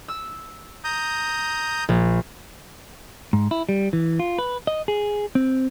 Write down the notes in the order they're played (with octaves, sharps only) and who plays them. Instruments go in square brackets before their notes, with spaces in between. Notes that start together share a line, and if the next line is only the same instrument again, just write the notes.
[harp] E6
[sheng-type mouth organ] A#5 D#6 G6
[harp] A#1
[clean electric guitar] G#2
E4
G3
E3
F4
B4
D#5
G#4
C4